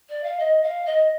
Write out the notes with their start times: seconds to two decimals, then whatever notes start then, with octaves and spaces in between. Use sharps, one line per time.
0.09 D5
0.23 F5
0.39 D#5
0.63 F5
0.85 D#5